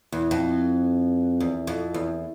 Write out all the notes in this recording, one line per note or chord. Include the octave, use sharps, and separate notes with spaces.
E2
F2
E2
F2
E2